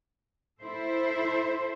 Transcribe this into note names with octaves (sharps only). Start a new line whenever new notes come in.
E4 A4 C5